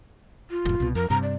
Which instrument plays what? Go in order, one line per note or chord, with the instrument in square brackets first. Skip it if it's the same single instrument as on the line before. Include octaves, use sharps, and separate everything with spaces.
[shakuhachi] F4
[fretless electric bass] F1 A2
C2 B2
[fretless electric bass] F2 [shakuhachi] A#4
[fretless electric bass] G2 C3 [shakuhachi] A#5
[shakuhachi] D5